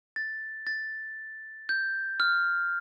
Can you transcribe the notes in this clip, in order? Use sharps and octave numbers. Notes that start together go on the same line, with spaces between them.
A6
A6
G6
F6